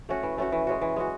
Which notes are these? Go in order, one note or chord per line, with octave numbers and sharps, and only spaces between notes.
A3 C#4 F#4
E3
A3 C#4 F#4
E3
G#3 C#4 F#4
E3
G#3 C#4 F#4